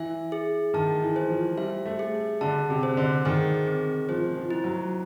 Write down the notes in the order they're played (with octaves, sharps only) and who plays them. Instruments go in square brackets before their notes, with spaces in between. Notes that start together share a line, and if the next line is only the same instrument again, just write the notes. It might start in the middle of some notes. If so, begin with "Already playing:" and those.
Already playing: [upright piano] E3 [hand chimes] E5
[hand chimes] G#4
[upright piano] D#3 [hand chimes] A5
[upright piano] E3
[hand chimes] C5
[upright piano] F3
[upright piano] G3 [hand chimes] E5
[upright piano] A3
[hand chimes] G#4
[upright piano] D3 [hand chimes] A5
[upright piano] C3
[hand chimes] C5
[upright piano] D3
[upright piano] D#3 [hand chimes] G#4
[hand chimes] C4
[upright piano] F3 [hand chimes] C5
[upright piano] F3
[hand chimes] E4
[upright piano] F#3